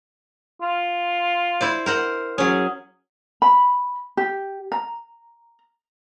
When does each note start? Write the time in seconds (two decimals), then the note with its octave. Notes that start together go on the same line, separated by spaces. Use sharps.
0.62 F4
1.61 E4 C5 D5
1.86 A#4 C5 F#5
2.38 F#3 C#4 G#4
3.42 B5
4.17 G4
4.72 A#5